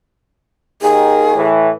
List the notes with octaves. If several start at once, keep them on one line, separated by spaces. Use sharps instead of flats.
D#2 D#3 G#4
A2 E3